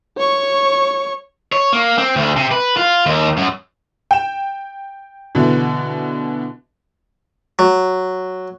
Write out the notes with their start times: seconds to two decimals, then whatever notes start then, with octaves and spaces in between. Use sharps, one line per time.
0.17 C#5 C#6
1.52 C#5
1.73 A#3
1.98 C4
2.16 D2
2.36 C3
2.51 B4
2.77 F4
3.06 D#2
3.37 F#2
4.11 G5 E7
5.35 B2 D3 E3
7.59 F#3